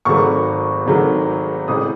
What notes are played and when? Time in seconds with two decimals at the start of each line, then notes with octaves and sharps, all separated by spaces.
0.05 G#1 G#2 D#3 F#3 A3 C#6
0.86 G#1 G#2 D#3 F#3 A3
1.68 A1 A2 G#3 D#6